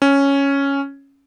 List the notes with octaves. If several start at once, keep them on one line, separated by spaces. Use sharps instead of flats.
C#4